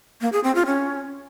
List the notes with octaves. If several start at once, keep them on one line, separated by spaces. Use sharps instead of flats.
A#3
G#4
C4
F4
C#4